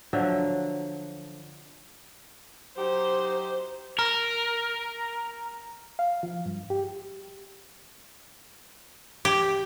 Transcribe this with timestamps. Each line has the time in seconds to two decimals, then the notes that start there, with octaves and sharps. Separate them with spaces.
0.13 D3 F3 F#3 E5
2.77 F#3 D#4 G4 C5
3.99 A#4 A#5 F6 A#6
5.99 F5
6.23 F3
6.46 G2
6.70 G4
9.25 G4